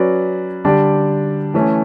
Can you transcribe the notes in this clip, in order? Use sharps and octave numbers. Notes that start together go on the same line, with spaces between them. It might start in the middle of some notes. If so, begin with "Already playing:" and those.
Already playing: F#3 C#4 F#4 B4 D5
D3 G3 D4 G4 D5
E3 A3 C#4